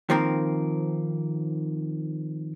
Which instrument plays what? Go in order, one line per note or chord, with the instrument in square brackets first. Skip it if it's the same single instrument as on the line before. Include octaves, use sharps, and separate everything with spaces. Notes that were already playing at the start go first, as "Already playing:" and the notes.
[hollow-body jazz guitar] D#3 F3 A#3 C4 A#4